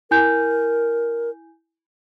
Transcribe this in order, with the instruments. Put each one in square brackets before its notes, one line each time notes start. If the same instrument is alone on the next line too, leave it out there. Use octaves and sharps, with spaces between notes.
[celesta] E4 G#5 G6 [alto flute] A#4